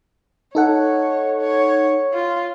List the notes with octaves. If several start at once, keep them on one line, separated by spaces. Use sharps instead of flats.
D#4 A4 C#5 F#5
C#5
F4